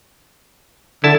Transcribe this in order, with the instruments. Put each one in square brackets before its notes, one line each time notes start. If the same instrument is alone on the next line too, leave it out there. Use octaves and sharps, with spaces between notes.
[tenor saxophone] D3 [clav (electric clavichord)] E4 A5